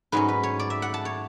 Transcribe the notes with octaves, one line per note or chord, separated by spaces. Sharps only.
G#2 F#3 C#4 B4
B4
C#5
D5
E5
F#5
A5
C#5